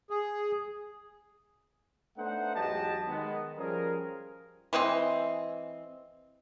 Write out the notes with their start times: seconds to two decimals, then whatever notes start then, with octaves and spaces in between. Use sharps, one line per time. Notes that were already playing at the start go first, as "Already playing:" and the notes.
0.10 G#4
2.18 A3 B3 D4 D#4 C5 F#5
2.54 E2 G#2 F#3 G4 D#5 A5
3.07 D#3 G#3 B3
3.58 F3 G3 C#4 G#4 A#4
4.73 E3 G#3 C4 D#5